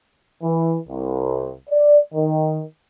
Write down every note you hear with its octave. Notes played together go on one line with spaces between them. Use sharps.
E3
C2
D5
D#3